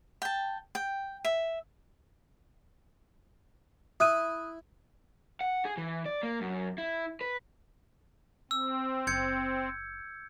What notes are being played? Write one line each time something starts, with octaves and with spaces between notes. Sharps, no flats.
G5 A5
G5
E5
E4 D#6 F#6 D#7
F#5
G#4
E3
D5
A#3
F#2
E4
B4
C4 E6
F#1 G6 G#6 C#7